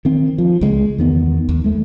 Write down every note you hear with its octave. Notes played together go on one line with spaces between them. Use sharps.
D#3 C4
F3
C#2 G#3
E2 D#3 B3
D#2
G#3 A3